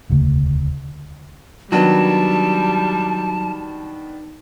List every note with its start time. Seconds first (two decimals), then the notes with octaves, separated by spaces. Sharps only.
0.09 E1 D2 C#3 A3
1.72 D#3 F#3 G3 B3 D4 A5